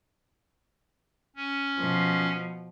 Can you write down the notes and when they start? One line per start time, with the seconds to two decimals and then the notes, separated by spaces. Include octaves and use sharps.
1.36 C#4
1.78 B2 F3